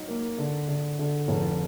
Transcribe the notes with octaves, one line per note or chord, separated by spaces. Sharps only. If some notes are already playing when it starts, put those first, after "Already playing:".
Already playing: F#3 D#4
A#3
D3
D3
D3
F1